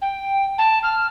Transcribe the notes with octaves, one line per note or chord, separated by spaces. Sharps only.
G5
A5
F6